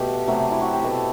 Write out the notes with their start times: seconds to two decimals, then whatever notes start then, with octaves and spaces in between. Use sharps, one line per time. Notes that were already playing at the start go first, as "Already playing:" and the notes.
Already playing: B2 A3 G4
0.27 C3 F#3 A3
0.51 E4
0.61 F#4
0.73 G4
0.83 B2 A3 A4